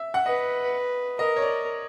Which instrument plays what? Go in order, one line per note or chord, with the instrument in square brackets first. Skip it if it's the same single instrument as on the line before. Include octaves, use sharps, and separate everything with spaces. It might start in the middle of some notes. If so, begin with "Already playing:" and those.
Already playing: [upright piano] E5
F#5
[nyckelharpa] B4 [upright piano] D#5
[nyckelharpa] A#4 [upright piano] D#5
[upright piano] C#5
D5